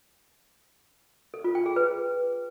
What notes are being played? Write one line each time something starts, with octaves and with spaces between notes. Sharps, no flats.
A4
F4
G5
G#4
B4